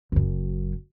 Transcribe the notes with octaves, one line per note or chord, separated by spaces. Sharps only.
F#1 F#2